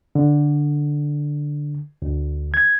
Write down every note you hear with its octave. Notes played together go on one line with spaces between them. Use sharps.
D3
D2
G#6